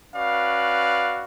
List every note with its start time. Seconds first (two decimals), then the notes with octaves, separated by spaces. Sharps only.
0.13 C#4 F#4 B4 D5 F5